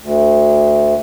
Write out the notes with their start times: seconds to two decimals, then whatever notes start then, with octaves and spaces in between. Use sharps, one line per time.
0.02 D2